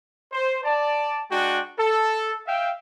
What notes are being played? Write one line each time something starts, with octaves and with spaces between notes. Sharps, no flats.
C5
D5 A5
G#3 D4 F#4 G5
A4
E5 F5 G5